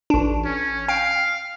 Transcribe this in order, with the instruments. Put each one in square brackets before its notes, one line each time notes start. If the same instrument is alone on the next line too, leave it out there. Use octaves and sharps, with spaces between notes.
[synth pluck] A1 D4
[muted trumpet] C#4
[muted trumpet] F5 [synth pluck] G5